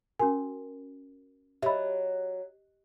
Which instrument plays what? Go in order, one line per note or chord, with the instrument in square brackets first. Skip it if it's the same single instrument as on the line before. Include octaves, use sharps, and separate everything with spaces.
[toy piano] C#4 F#4 A#4 [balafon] G#5
[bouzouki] F#3 [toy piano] G4 D#5 [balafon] E5 B5